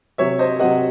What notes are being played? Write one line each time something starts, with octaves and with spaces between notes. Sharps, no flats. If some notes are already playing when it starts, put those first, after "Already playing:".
C3 F#3 C#5 E5
C5 D#5
C3 F#3 D#5 F#5